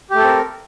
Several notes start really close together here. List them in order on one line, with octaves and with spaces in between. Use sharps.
G4 A3 A4 C4 A#4